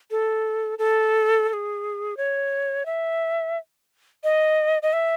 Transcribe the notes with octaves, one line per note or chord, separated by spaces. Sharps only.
A4
A4
A4
G#4
C#5
E5
D#5
D#5
E5